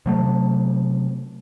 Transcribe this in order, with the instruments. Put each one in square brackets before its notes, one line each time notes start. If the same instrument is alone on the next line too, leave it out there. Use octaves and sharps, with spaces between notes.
[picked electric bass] C3 F#3 A3